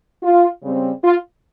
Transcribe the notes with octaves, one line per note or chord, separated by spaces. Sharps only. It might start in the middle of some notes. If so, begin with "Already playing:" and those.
F4
C#3 G3 C4
F4